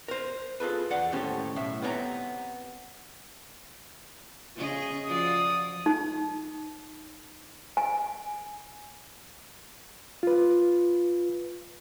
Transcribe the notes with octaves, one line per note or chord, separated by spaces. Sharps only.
A#4 C5
F4 G#4 A4 B4
E2 D5 F#5
D#2 A2 C#4 G4 A4 C5
B1 A2 E5
B3 C4 G4 C#5 A5 A#5
C#3 G#4 D#5
F3 F#4 D5 D#6
D#4
G#5
F4 B4